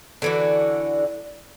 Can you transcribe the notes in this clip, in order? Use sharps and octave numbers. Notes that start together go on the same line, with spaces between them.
D3 E3 F#4